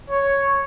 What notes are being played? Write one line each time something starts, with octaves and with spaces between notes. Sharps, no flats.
C#5